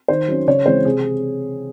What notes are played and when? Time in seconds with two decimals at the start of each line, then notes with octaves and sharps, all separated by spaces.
0.08 D#3 C5
0.28 F#3 C#4
0.48 C#3 C#5
0.66 E3 G#3 C4 C5
0.85 C3 G#4